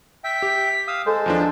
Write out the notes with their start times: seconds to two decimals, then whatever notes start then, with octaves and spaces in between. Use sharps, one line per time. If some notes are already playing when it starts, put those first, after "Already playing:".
0.24 E5 G5 B6
0.42 G4
0.88 F5 D#6 E6
1.06 G#3 A4 C5
1.26 E2 F3 D4